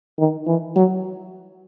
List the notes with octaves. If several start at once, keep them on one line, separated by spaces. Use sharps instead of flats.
D#3
E3
F#3